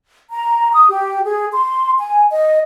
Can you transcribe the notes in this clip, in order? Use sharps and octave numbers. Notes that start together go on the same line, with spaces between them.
A#5
D#6
G4
G#4
C6
G#5
D#5